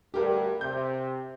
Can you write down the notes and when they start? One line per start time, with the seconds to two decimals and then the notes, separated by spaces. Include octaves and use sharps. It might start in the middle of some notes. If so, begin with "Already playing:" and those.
0.14 D2 G2 G4 A#4
0.61 C3 G6